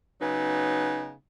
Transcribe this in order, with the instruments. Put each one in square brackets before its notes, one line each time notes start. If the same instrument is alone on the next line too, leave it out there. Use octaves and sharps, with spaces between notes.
[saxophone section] C#3 F#3 B3 D#4